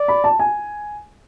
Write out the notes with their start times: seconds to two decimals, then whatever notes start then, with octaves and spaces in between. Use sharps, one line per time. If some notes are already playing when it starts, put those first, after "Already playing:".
Already playing: D5
0.08 B5
0.24 A5
0.39 G#5